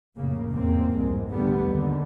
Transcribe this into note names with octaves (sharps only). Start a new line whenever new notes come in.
F1 A2 C#3 A#3
E2 G#2 A#3 C4
C2 F2 G#2 G#3
D3 G3 A3 B3
D#2 G#2 D3